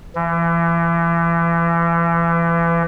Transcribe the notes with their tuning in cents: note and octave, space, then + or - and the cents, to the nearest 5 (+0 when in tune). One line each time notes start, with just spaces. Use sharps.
E3 +35